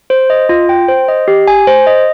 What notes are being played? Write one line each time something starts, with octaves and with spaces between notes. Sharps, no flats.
C5
D#5
F4
G5
C5
D#5
G4
G#5
C5
D#5